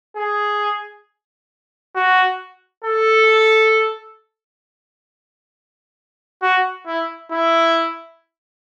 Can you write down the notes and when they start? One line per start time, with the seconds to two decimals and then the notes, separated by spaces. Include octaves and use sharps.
0.16 G#4
1.95 F#4
2.84 A4
6.42 F#4
6.86 E4
7.31 E4